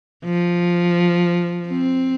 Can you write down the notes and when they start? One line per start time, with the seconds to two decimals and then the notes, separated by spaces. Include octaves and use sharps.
0.25 F3
1.68 C4